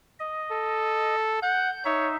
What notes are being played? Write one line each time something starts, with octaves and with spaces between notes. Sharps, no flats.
D#5
A4
F#5 G6
D#4 C#5 E5